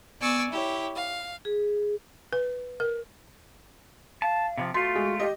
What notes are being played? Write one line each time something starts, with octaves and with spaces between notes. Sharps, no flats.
B3 D5 G#5 C#6 E6
E4 G4 C#5
F5
G#4
B4
A#4
F5 A5
C3 E3 F3
A3 F4 F#4 C6
G#3
G4 D#5